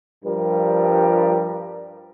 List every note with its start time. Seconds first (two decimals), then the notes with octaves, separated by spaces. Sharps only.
0.24 G2 F3 G3 A#4